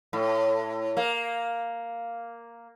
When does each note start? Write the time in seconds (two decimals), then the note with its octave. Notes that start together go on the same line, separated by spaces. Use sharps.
0.13 A2
0.97 A#3